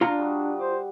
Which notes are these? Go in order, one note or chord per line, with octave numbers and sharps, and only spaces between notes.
D4 F4 A#5
G3 D#4 F#4
C5 D6